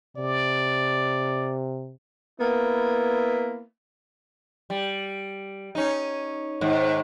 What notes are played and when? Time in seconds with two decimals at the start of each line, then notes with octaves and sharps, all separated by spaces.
0.17 C3 D5
2.40 A#3 B3 E4
4.70 G3
5.75 C#4 D#4
6.61 G#2 D#3